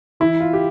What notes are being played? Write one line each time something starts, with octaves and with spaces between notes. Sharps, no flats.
E3 E4
F4
G4